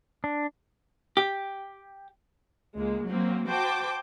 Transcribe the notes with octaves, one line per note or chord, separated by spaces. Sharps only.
D4
G4
C#2 G#3 A#3
F#3 A#3 C4
F#4 C5 G5 A5 D6